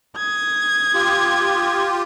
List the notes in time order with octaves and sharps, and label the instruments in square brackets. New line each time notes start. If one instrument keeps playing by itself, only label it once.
[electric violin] D#6 G#6
[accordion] F4 G4